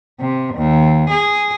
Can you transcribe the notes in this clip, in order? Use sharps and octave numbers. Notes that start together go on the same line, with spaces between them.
C3
D#2
G#4